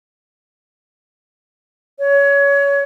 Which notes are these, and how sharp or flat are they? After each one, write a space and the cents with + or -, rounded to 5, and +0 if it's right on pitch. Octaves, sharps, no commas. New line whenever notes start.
C#5 +25